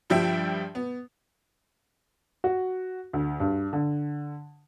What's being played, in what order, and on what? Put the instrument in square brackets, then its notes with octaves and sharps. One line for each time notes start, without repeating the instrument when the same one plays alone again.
[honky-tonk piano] G2 F3 G3 E5 G5
B3
[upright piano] F#4
D2
G2
D3